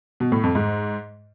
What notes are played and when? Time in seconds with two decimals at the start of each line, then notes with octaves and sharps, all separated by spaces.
0.20 B2
0.32 A2
0.43 F2
0.55 G#2